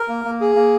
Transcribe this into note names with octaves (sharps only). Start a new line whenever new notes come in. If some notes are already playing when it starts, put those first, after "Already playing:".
Already playing: A#4
A#3
A#3
G#4
A#3